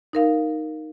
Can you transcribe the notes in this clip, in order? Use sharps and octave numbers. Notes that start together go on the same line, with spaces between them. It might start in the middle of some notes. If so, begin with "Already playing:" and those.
D#4 A#4 F5